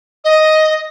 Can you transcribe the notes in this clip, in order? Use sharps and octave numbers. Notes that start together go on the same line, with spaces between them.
D#5